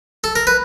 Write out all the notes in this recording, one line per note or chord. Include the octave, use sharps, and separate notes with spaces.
A4
A#4
B4